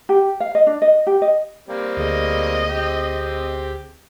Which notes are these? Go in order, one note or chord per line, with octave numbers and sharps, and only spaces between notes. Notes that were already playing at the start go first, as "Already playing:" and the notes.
G4
F5
D#5
D4
D#5
G4
D#5
G3 A#3 C4
D2 D3 G#4 D#5
C4 G4